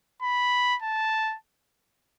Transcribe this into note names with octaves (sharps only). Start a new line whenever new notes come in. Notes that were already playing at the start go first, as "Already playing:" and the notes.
B5
A5